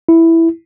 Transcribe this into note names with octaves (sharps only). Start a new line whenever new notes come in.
E4